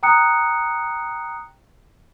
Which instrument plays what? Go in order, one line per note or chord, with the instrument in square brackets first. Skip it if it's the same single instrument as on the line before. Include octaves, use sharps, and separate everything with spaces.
[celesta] G5 A#5 D#6 F#6 C#7